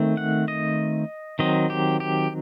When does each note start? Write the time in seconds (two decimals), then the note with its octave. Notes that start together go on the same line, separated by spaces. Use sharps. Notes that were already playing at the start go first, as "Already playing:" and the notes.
Already playing: D#3 A3 C4
0.17 F#5
0.48 D#5
1.39 D#3 F#3 C4 D#5
1.70 G4
2.00 G4